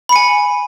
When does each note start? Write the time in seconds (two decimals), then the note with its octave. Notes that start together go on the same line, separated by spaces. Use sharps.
0.09 B5
0.12 C#7
0.16 G#5